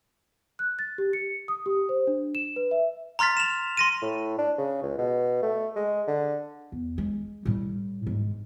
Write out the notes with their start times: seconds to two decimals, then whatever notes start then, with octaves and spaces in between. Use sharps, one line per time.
0.59 F#6
0.79 A6
0.98 G4
1.13 C#7
1.48 D#6
1.66 G4
1.89 C5
2.07 D4
2.35 E7
2.56 B4
2.71 E5
3.19 A#5 C6 F6 A6 B6
3.37 E7 F7
3.77 C6 A#6 D#7
4.01 A2
4.38 D4
4.58 C#3
4.83 C#2
4.98 B2
5.43 A3
5.76 G#3
6.07 D3
6.72 E2
6.98 G#3
7.45 A2 G3
8.07 G#2